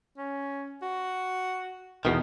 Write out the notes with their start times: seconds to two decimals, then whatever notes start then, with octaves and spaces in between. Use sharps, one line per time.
0.18 C#4
0.82 F#4
2.05 E2 B2 D#3